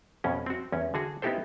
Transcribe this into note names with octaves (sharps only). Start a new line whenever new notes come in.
F2 B2 C#4
C4 F#4
E2 C#4
D3 F#4 G#4
B3 D#4 E4 G4 A4 C5